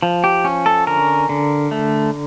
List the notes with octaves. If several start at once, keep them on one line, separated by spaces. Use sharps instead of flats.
F3
G4
C#4
A4
D3 A#4
D3
A3